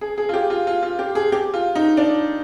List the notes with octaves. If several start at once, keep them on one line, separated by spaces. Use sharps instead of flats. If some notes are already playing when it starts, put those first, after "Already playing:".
G#4
G#4
F4
G4
F4
F4
F4
G4
G#4
G4
F4
D#4
D4